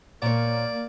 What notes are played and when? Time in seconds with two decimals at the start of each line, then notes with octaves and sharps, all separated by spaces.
0.22 A#2 A#3 C#5 D5